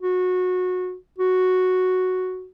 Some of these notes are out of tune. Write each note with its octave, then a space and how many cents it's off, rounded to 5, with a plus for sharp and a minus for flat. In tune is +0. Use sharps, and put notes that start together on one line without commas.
F#4 -20
F#4 +0